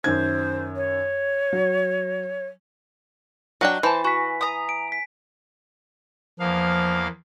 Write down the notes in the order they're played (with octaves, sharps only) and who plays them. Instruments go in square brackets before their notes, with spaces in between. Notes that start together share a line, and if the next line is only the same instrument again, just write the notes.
[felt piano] F#2 D#3 G#6 [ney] C5
[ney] C#5
[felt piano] F#3
[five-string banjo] F#3 D4 G5 [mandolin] D#5 F#6
[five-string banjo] E3 [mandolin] C5 A5
[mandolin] F#4 [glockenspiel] G#5 B6
[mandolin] A#5 D#6
[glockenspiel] D7
B6
[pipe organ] E2 A#3 F5 [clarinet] F3